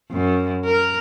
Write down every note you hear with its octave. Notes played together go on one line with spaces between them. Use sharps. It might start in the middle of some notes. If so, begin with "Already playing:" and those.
F#2
A#4